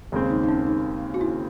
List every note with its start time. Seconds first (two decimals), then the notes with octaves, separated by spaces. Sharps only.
0.12 D#2 C#3 G#3 C4
0.30 D#4
0.44 D#4
0.49 C#4
0.67 D#4
1.14 F#4
1.21 E4